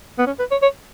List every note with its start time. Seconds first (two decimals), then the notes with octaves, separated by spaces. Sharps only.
0.19 B3
0.27 C#4
0.39 B4
0.52 C#5
0.63 C#5